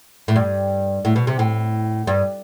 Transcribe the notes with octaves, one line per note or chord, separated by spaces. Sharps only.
A2
G2
A2
B2
C3
A2
G2